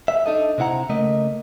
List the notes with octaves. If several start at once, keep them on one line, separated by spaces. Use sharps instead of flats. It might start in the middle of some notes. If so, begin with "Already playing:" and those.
E5
D4 D#4 A4 D#5
C3 C4 E4 F#5 A#5
C#3 A3 A#3 D#5